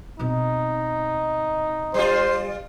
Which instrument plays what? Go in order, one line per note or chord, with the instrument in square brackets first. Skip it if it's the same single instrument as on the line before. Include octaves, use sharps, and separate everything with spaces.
[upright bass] B2 C4 [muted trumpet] D#4
[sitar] G3 F4 [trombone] C5